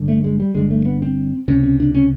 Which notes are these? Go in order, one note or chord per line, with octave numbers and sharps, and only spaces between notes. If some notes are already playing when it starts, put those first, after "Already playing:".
Already playing: G#1 G2 D3
A3
G#3
G3
G1 G2 D3 G#3
A3
B3
C4
C#2 C3 C#4
C#4
D4
C#4